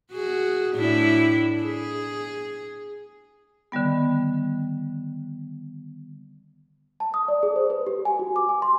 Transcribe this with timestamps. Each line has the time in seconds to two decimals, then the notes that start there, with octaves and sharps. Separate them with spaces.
0.12 F#4 G#4
0.76 A2 D4 E4
1.62 G#4
3.72 D3 D#3 G3 B3
7.00 A5
7.14 D#6
7.28 D5
7.43 G#4
7.56 C5
7.70 B4
7.87 G4
8.05 G#5
8.19 F#4
8.36 D6
8.49 G#5
8.62 C6